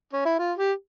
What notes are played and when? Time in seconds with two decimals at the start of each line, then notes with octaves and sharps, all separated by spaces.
0.13 C#4
0.25 E4
0.39 F4
0.58 G4